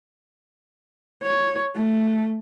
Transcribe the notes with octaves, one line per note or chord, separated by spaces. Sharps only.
C#5
A3